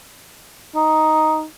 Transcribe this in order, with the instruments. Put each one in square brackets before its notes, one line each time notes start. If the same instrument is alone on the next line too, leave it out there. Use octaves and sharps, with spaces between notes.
[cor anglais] D#4